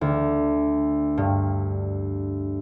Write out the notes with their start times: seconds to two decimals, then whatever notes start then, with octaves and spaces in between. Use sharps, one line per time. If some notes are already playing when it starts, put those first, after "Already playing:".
0.01 D2
1.18 G2